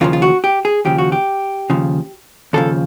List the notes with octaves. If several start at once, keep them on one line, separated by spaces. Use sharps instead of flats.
D#2 C#3 F3 F4
F4
F#4
G4
G#4
D#2 C#3 F3 G4
F#4
G4
D#2 C#3 F3
D#2 C#3 F3 A4